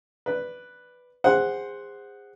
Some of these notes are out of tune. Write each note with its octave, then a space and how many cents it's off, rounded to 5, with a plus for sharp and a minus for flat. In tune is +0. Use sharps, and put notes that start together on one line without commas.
B4 +0 D5 +0
G#4 -30 C5 +0 F#5 +0